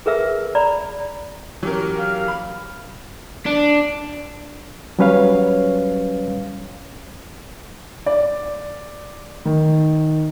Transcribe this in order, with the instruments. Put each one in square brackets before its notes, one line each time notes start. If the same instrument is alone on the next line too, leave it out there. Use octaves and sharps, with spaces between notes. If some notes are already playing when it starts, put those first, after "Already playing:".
[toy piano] G#4 A#4 B4 E5 E6
D5 A#5 B5
[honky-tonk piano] E3 C#4 A#4 [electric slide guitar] F#3 G4
[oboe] F5
[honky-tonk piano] B5
[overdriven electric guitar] D4
[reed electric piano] F#3 G3 C#4 B4 C#5 F5
[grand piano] D5
D#3